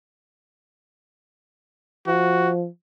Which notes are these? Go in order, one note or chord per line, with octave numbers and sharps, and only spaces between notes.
F3 F#4